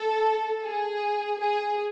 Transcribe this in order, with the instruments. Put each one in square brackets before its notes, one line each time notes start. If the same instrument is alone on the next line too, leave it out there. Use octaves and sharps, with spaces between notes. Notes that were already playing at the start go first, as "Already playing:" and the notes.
Already playing: [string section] A4
G#4
G#4